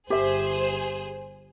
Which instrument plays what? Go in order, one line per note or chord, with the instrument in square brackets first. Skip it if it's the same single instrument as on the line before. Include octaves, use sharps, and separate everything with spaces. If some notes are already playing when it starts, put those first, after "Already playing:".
[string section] G1 G#4 C5 [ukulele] G4 E5